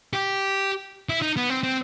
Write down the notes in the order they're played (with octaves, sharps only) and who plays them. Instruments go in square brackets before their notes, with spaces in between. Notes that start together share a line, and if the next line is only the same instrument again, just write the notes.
[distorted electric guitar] G4
E4
D#4
B3
C4
C4